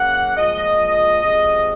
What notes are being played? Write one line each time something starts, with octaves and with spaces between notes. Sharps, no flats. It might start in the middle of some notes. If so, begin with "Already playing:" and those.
Already playing: C#3 F#3 A#3 F#5
A#2 F3 G#3 D#5
C3 F3 G#3